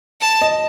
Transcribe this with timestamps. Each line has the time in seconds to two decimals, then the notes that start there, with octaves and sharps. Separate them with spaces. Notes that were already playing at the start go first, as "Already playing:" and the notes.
0.21 A5
0.41 D#5